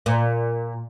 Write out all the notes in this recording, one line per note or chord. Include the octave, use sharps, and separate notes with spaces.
A#2